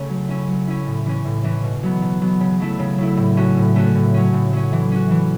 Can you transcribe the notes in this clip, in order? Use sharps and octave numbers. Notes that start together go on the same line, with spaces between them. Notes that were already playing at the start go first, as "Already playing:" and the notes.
Already playing: C#3 A3 C#4
F#3
C#4 E4
F#3
C#4 E4
A2
E3 C#4
A2
E3 C#4
B2
F#3 B3
B2
F#3 B3
C#3
F#3 A3 E4
C#3
F#3 A3 E4
A2
A3 C#4 F#4
A2
A3 C#4 F#4
A2
F#3 C#4
A2
F#3 C#4
E3
C#4 F#4
E3